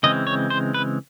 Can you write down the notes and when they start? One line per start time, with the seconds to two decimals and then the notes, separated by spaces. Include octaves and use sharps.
0.03 C#3 E3 G#3 C4 D#5
0.27 C#5
0.50 C5
0.74 B4